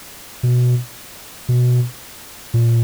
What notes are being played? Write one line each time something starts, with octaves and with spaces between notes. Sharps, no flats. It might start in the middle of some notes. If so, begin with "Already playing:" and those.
B2
B2
A#2